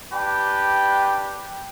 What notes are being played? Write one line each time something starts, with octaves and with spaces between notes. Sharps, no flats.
D4 G4 B4 G5